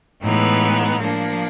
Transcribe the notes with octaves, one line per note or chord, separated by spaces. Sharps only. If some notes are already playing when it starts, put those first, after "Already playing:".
A2 E3 G#3 B3 D#4
F3 A#3 D4